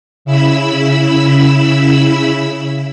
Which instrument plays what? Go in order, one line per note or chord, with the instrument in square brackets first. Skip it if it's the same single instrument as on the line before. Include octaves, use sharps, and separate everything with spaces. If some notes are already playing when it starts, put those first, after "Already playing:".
[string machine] C#3 E4 B5 E6